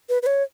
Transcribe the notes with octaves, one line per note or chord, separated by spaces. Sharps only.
B4
B4
C#5